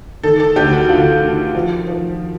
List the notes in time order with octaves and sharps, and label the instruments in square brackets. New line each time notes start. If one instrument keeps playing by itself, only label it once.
[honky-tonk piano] D#3 A4
A4
D2 G4
F#4
D2 F4
D#3
F3
F3